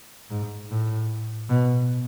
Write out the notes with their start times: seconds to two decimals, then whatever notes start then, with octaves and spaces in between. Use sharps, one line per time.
0.30 G#2
0.70 A2
1.49 B2